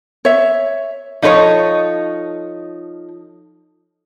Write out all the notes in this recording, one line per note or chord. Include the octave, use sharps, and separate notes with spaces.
C#5 E5
F3 D#4 A4 B4 C#5